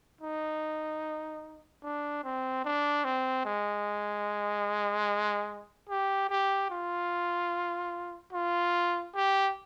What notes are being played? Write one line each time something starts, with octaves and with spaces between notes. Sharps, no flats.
D#4
D4
C4
D4
C4
G#3
G4
G4
F4
F4
G4